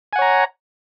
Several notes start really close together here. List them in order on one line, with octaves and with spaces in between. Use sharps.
G#5 F#5 C#5 A#5